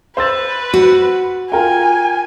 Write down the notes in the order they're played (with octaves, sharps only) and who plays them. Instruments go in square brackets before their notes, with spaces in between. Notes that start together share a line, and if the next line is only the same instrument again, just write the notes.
[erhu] B4 [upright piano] C5 E6 A6
[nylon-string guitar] F#4
[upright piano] F4 A#4 G5 [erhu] G#5